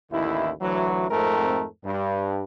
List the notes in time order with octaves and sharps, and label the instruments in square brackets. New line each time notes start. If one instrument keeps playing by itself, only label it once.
[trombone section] A1 D#2 D3 E4
D2 E3 F#3
F2 G#2 A3 C4 A#4
G2